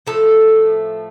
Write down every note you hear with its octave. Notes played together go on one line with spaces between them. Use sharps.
A2 F3 A3 A4